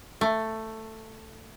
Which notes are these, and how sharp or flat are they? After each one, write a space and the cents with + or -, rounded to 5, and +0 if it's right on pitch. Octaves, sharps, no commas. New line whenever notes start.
A3 +10